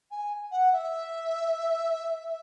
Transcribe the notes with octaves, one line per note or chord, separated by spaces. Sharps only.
G#5
F#5
E5